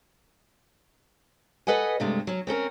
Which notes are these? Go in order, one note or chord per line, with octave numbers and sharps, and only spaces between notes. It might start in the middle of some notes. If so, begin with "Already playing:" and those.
A4 B4 D#5 F#5 G#5
G2 C3 G#3 A3
F#3 C#4
C4 C#4 A4 A#4